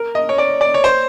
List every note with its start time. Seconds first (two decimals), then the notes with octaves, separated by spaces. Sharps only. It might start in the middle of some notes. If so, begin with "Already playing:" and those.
Already playing: A#4
0.15 D#5
0.29 C#5
0.38 D5
0.61 D5
0.74 C#5
0.84 C5